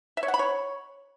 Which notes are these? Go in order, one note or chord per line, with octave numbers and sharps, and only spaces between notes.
E5
C#5
F#5
B5
C#5